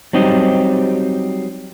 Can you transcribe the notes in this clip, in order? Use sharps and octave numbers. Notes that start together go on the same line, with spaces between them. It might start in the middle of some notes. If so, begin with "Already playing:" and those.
F#3 G3 C4 D#4 G4